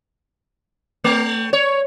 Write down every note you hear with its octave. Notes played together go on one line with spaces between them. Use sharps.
A3
C#5